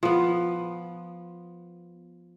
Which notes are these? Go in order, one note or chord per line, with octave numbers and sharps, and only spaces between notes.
F3 B3